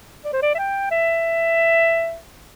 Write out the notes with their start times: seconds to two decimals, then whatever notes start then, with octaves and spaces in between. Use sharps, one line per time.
0.25 D5
0.33 C5
0.42 D5
0.55 E5
0.59 G5
0.91 E5